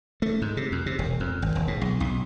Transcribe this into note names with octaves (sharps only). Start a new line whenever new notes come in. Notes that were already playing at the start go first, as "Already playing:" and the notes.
A3
G#2
C3
F2
C3
E1
F2
G#1
D#1
G#2
B1
B1